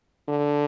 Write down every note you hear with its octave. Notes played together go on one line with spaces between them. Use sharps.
D3